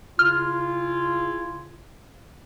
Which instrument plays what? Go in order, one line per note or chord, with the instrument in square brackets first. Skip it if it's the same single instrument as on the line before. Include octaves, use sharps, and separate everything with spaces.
[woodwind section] C#3 E4 F4 [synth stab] F6